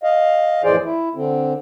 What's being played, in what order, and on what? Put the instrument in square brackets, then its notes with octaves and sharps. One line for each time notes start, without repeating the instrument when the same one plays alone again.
[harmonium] D#5 F5
F2 A2 E3 G#4 C5 D5
E4
D3 C4